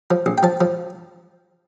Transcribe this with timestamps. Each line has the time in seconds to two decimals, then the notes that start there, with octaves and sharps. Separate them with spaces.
0.11 F3
0.26 A#1
0.38 G5
0.43 F3 A5
0.61 F3